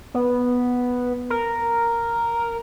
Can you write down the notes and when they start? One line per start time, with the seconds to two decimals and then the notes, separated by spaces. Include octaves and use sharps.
0.14 B3
1.30 A#4